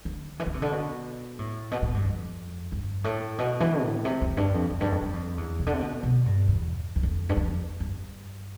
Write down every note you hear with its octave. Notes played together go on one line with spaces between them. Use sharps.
D3
E3
D3
C3
D3
B2
A2
B2
A2
G2
F2
G2
A2
B2
E3
A2
C3
F2
G2
F2
F2
G2
F2
G2
F2
E2
C3
D3
C3
B2
B2
G2
E2
E2
F2
G2
F2
G2